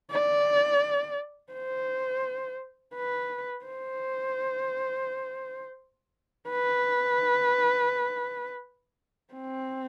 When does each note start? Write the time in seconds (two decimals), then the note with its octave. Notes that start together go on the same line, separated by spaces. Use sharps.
0.11 D5
1.53 C5
2.94 B4
3.66 C5
6.50 B4
9.33 C4